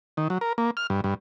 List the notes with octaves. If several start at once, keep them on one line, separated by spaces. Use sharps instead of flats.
D#3
F#3
A#4
A#3
F6
G2
G2